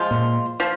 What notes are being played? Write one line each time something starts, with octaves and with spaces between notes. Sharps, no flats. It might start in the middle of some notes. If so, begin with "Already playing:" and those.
Already playing: F3 G#3 F4
A#2
F3